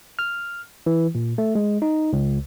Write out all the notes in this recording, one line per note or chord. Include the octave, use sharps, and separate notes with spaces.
F6
E3
A#2
A3
G#3
D#4
C#2